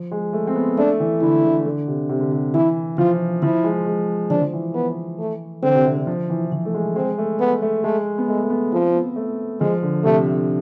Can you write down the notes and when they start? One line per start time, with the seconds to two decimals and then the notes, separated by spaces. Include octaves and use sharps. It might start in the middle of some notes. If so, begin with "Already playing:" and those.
Already playing: F3
0.11 G#3
0.33 A3
0.47 C4
0.56 B3
0.78 A3 D4
1.00 E3
1.22 D3 E4
1.44 D3
1.65 D3
1.88 C3
2.09 C3
2.20 D3
2.32 C3
2.54 E3 E4
2.98 F3 F4
3.43 F3 E4
3.64 G#3
3.86 G#3
4.30 F3 D4
4.41 F3
4.53 E3
4.75 B3
5.19 A3
5.63 D3 C4
5.75 C3
5.85 C3
5.97 D3
6.07 F3
6.30 E3
6.45 E3
6.52 F3
6.65 A3
6.74 G#3
6.96 G#3 C4
7.18 A3
7.40 B3
7.62 A3
7.84 G#3 A3
8.18 B3
8.28 G#3 A3
8.44 A3
8.50 B3
8.72 F3 C4
8.94 B3
9.16 A3
9.60 F3 G#3
9.82 D3
10.04 C3 A3